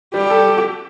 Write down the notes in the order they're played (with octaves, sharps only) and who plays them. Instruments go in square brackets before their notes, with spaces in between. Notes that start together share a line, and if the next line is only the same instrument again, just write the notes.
[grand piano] G3 [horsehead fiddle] G4
[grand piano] A4